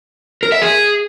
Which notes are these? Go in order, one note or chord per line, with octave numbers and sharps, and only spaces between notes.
A#4
E5
G#4